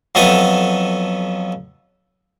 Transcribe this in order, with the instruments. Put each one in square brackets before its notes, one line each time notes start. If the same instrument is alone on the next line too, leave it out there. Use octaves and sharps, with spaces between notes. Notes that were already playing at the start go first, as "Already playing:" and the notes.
[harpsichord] F2 F#3 B3 A4 E5 D#6